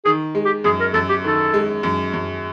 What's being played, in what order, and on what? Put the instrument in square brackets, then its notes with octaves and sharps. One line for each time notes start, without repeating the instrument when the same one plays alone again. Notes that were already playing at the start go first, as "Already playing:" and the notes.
[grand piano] D#3 [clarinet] G#4
[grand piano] G#3
[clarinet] G4
[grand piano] F#2 [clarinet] G#4
[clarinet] A#4
[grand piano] F#2 [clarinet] A4
[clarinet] G4
[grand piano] D#3 [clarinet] A4
[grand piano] G#3
F#2
F#2